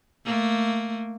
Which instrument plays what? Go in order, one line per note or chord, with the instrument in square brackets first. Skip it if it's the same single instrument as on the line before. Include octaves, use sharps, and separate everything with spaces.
[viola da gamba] A3 A#3